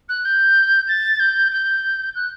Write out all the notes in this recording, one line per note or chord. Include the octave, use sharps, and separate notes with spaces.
F#6
G6
A6
G6
G6
F#6